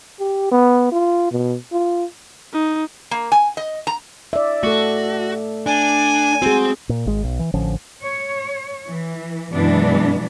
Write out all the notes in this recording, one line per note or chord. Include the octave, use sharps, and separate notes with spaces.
G4
B3
F4
B2
F4
D#4
A#3
G#5
D#5
A#5
D5 E5
A3 F#4 A4
D4 G#5
C4 F#4 G#4
A#2
G#1 G#3
B1
E3
A1 D3 F3 C#4
C#5
E3
F#2 B2 E3 G#3 B3 D4